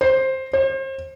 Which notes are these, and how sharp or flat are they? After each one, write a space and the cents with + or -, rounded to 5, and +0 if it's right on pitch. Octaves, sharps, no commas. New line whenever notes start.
C5 +10
C5 +35